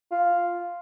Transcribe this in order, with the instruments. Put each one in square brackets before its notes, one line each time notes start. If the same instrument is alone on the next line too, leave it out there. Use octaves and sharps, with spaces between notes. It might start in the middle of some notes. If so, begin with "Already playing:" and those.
[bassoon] F4